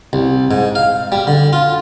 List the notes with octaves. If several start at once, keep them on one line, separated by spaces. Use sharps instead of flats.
C2
G#2
F5
G3
D3
F4